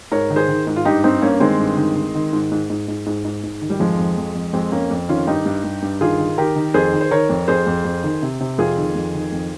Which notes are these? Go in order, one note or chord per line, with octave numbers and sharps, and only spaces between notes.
G#2 A#4 C#5
D#3
G#4 C5
D#3
G#2
F4
G2 D#4 G4
G2 C4 D#4
G2 A#3 C#4
D#3 G#3 C4
G2
D#3
D#3
D#3
G#2
G#2
G#2
G#2
G#2
G#2
G#2
D#3
G3
F2 F3 G#3
F2
F2
F2
F2 G#3 C4
F2 A#3 C#4
F2
D#3 C#4 F4
G2 D#4 G4
G2
G2
G2
D#3 F4 G#4
D#3
D#3 G4 A#4
D#3
F2 G#4 C5
D#3
C5
D#3 A#4 C#5
F2
F2 G#4 C5
F2
F2
D#3
C3
C3
F2 F4 G#4
D#3
F2
D#3
F2